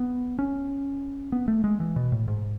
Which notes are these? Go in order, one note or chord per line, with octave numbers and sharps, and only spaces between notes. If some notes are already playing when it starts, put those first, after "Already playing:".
Already playing: B3
C#4
B3
A3
G#3
E3
B2
A2
G#2